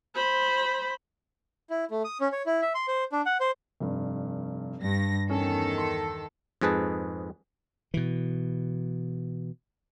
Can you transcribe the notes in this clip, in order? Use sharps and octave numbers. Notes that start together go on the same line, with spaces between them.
C5 B5
E4
A3
D#6
C#4
C#5
E4
E5
C6
C5
D4
F#5
C5
F1 G2
G2 A#6
E2 D#3 C#4 A4
C6
F2 G#2 G#4 B4 A5
B2 E3